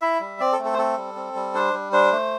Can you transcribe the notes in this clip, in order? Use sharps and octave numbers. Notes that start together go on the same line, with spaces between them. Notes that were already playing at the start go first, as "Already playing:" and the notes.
E4 E5
G3
C4 D5
A4
A3
A4
C5
C4 A4
G3
C4
G3
D4 C5
G3
D4 C5
A3